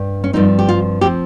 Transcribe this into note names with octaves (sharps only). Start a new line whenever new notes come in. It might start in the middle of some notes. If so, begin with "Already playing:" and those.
Already playing: G2
C#4
G2 F3 C4 D#4
G4
F4
F3 C4 G4